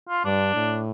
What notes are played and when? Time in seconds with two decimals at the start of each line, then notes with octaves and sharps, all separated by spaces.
0.09 F4
0.25 G2 D4
0.55 A2